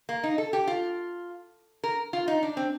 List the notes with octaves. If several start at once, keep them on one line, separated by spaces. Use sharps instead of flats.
A#3
D#4
A4
G4
F4
A#4
F4
D#4
D4
C4